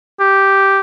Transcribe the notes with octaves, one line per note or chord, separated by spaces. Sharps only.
G4